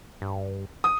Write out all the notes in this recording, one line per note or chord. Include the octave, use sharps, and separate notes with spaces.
G2
D#6